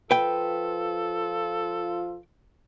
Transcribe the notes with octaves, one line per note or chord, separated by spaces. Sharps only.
F3 F4 A4 B4 G5